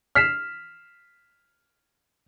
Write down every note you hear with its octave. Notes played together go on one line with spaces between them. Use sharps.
F6 B6 C7 E7